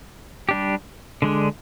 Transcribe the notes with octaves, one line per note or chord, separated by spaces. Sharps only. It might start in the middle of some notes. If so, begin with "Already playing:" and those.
G3 D4 G4
D3 G#3 D4